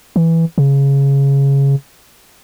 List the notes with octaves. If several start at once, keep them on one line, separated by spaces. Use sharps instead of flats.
E3
C#3